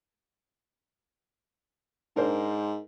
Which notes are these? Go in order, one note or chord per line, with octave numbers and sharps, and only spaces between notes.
G#2 D4 A#4 C5